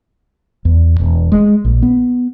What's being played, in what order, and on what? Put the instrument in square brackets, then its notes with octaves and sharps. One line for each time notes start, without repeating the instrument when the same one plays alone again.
[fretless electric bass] E2
E1
G#3
A#1
B3